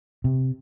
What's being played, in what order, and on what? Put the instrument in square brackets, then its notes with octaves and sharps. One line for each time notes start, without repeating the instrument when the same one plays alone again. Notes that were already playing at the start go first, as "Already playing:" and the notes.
[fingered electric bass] C3